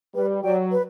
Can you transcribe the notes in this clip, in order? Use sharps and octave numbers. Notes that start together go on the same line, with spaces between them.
G3 B4
F#3 D5 G5
B4